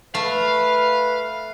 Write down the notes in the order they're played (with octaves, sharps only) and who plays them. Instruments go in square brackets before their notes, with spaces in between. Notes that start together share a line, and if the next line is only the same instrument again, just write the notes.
[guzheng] A3 [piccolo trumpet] B4 [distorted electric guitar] F5